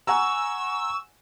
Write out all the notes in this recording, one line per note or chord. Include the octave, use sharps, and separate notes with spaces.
F#5 G#5 A#5 C#6 E6